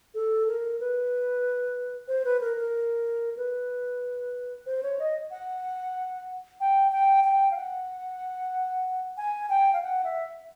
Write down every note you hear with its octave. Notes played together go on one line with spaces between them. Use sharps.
A4
A#4
B4
C5
B4
A#4
A#4
B4
C5
C#5
D#5
F#5
G5
G5
G5
F5
F#5
G#5
G5
F5
F#5
E5